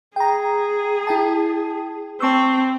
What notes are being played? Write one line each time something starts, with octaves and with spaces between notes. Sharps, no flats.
G#4 G5 A#5
E4 G5 A5
C4 A5 C#6 E6